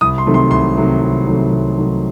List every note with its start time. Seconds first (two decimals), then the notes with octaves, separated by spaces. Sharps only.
0.01 C2 D#6
0.18 C6
0.26 C3 D#3 F#3 A3
0.34 C6
0.51 C2 C6
0.77 C3 D#3 F#3 A3
1.01 C2
1.26 C3 D#3 F#3 A3
1.52 C2
1.77 C3 D#3 F#3 A3